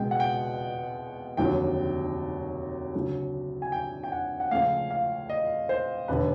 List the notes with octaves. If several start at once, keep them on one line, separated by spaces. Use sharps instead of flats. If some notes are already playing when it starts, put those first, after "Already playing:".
Already playing: C#2 B2 G#3 G5
F#5
G5
F1 D#2 D3 F#3 G5
D2 C#3 F#3
G#5
G5
G5
F#5
F#5
C#2 C#3 F3 A3 F5
F5
D#5
C5
E1 D#2 D3 B4